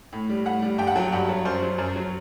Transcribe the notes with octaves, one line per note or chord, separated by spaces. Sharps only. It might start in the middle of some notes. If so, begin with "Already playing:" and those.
A2
G3
A2 F#5
G3
G2 G5
F#5
F#3 G5
G2 F#5
F#3
F#2 C5
F#3
F#2
F#3